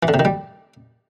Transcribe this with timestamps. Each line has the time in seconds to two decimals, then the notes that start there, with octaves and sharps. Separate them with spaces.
0.03 E3
0.08 D3
0.14 C3
0.19 D#3
0.25 G3